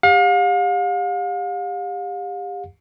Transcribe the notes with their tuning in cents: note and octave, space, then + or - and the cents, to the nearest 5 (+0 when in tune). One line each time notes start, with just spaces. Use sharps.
G4 +30 F5 +40